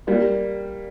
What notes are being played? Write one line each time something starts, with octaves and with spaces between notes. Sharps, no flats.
G3 A#3